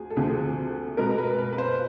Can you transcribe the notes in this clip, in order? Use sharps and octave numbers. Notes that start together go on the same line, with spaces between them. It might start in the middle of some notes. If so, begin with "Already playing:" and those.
Already playing: D2 G#4
A4
D2 D3 F3 A3 C4 G#4
B2 G#3 B3 A#4
B4
B4
B4
C5